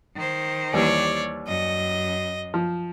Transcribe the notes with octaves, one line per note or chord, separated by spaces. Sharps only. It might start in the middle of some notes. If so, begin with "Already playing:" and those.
D#3 C5
D#2 E3 G3 C#5 D5
F#2 D#5
F3